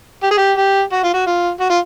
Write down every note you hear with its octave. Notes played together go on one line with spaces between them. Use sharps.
G4
G#4
G4
G4
F#4
F4
F#4
F4
F#4
F4